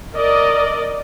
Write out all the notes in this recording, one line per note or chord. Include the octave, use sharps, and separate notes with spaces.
A#4 D5 D#5